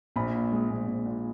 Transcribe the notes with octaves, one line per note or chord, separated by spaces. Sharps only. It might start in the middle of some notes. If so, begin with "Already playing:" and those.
A#1 B5
A#2
G#3
A#1
A#1
A#2